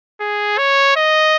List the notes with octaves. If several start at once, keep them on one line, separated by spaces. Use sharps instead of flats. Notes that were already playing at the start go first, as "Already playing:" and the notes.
G#4
C#5
D#5